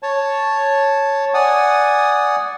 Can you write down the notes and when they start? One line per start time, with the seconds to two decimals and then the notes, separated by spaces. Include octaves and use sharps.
0.03 C#5 A5
1.34 D5 F#5 G#5 D#6